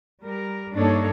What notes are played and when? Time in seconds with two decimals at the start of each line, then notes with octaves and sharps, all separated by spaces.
0.23 G3 A#4
0.73 G2 A#3 D4 D#4 A4 C#5